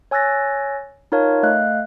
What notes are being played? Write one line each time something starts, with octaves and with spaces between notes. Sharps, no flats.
C#5 G#5 E6 F#6 A6 A#6
D#4 F4 A#4 C#5 F5 A5
A3 D#5 F5 F#6